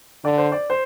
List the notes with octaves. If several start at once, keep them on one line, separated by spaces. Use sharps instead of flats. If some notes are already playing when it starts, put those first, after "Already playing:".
D3 D5
C5
D5
C5